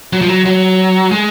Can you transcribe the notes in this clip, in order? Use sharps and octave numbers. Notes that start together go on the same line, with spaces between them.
F#3
F3
F#3
F#3
G#3